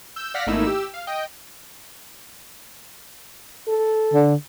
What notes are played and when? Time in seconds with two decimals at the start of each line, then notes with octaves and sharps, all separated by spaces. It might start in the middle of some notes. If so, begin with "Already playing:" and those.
0.16 E6 G6
0.34 D5 F5 F#5 F6 A#6 B6
0.47 G#1 A3 A#3 D#4 E4 E6
0.64 G4 E6
0.94 F5
1.07 D#5 G5
3.68 A4
4.14 D3